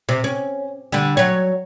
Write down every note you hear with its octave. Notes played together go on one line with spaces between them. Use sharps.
C3
C#4
D3 G3
F#3 C#5